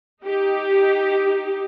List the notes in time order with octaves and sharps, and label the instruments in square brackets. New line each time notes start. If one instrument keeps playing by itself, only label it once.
[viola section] D#4 G4